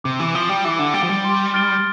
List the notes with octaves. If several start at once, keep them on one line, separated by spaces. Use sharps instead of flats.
C3 D6
E3
F3 A6 D7 G7
G3
E3 D6
D3
G3 A6 D7 G7
F3
G3
C6
F6 A6 D7 G7